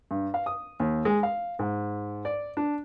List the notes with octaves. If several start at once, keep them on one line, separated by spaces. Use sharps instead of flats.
G2
F5
D#6
D#2
G#3
F5
G#2
D5
D4